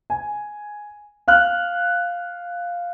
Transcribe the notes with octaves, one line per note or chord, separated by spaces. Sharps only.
G#5
F5 F6 F#6